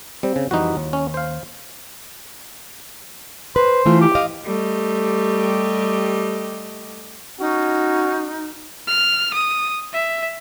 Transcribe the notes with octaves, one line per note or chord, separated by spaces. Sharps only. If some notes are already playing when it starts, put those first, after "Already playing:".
G3 C4
C#3
F2 E3 G3 D#4 F#4
D#2
C#4
C5 F5
B4 C5
E3 A3 F4
G4
D#5 F5
G3 A3 G4 D#5
C#4 D#4 F#4
F6
D#6
E5